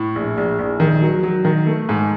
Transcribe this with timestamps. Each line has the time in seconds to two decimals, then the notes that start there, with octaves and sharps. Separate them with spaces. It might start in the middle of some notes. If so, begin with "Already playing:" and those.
Already playing: A2
0.16 A#1
0.38 A#1
0.59 A#1
0.80 D#3
1.02 F#3
1.23 F#3
1.45 D#3
1.67 A3
1.89 G#2